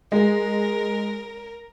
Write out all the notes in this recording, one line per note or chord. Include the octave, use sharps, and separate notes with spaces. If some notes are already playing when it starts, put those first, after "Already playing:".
G#3 A#4